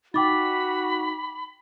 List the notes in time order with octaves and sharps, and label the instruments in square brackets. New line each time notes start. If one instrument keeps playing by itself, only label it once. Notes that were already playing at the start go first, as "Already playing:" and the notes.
[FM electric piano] D#4 [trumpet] F#4 [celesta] G5 D6 A6 [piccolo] B5